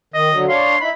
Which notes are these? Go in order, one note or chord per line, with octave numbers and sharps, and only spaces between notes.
D#3 D#5
D3 F#3
D4 C#5 F5 C6
D#4 E4 B5